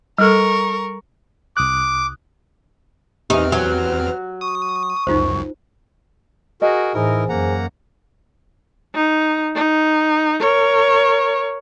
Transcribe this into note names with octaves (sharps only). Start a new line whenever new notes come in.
G3 A4 A#4 C#6
C2 D6 D#6 F#6
E2 C4 D#4 G4 B4 G#5 F6
F#3 G#5
C#6 D#6
C#2 F#2 D#4 F4 C5
F#4 G#4 A#4 D#5
A2 E3 D#4 E4 G#4 A#4 C5 G#5
F#2 A#3 F#5 A#5
D#4
D#4
A#4 C#5